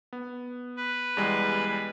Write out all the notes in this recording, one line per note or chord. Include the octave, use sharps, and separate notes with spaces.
B3
B4
E2 G3 G#3